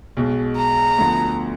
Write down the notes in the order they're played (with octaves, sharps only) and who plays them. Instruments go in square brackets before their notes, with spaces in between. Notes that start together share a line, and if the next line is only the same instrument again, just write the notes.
[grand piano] B1 B2 G#3
[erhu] A#5
[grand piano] D2 D3 F3 B3